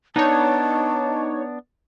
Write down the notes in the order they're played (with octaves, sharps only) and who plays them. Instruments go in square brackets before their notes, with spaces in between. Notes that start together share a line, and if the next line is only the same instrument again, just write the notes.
[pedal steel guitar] B3 D4 [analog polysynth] D#4 C#5 [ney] A5